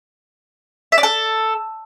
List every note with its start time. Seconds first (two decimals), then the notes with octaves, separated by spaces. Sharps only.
0.92 E5
0.98 D5
1.03 A4